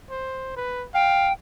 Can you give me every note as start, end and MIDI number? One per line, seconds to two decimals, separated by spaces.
0.10 0.56 72
0.56 0.86 71
0.94 1.31 77
0.94 1.32 79